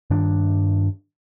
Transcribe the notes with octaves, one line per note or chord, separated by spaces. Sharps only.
G2 D#3 D4